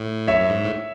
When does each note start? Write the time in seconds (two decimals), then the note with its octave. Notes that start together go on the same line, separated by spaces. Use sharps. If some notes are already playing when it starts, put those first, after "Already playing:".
Already playing: A2
0.27 F#2 C#5 E5
0.41 F#2
0.50 G#2
0.64 A2